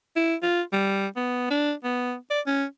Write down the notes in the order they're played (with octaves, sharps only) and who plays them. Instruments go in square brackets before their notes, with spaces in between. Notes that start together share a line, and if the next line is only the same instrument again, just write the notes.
[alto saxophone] E4
F4
G3
B3
D4
B3
D5
C#4